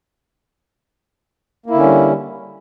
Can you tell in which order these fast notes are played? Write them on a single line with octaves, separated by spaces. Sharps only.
A#3 E4 D3 C#4 G3